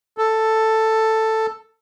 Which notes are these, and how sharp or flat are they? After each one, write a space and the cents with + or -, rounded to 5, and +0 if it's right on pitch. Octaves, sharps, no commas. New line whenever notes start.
A4 +5